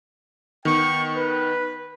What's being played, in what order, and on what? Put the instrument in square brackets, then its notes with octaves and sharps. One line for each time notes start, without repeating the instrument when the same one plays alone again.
[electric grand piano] D#3 B3 [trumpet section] G5 C#6
[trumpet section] B4